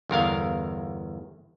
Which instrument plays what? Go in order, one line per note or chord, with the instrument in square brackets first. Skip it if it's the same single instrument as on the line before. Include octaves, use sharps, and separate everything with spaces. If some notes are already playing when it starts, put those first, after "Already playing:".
[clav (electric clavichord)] G1 E2 A#4 F5